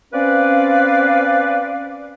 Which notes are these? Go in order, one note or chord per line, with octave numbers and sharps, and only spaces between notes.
C4 C#4 B4 D5 F5